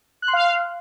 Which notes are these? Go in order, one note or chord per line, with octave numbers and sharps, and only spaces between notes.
F#6
C6
F5